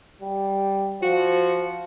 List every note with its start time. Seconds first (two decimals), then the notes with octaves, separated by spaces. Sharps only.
0.22 G3
1.02 F3 F#4